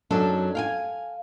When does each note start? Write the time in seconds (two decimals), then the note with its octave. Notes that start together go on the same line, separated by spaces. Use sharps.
0.10 F#2 F#3 D4 D#4 A4
0.55 F5 G5 G#5